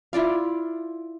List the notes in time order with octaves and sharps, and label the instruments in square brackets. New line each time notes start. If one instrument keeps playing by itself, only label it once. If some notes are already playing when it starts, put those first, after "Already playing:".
[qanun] E4 F4 D5 F5